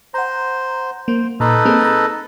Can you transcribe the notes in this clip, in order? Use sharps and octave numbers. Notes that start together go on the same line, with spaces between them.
C5 F#5 A#5
A#3 C5
A#2 D#4 A4 B4 A#5 C6
A#3 C4 G#4
A5 A#5